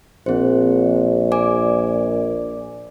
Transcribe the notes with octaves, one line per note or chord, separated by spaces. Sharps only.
A#1 C4 C5
D5 G#5 D6